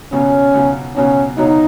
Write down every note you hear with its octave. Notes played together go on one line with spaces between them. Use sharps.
C#2 B2 F#3 C#4
C#2 B2 F#3
C#2 B2 F#3 C#4
C#2 B2 F#3 D#4